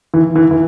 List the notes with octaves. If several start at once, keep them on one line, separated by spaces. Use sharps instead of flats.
E3
E3
E3